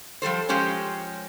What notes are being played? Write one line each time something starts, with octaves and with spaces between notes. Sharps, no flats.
F3 G3 A4 C5
F3 G#3 C#4 G4 C5 C#5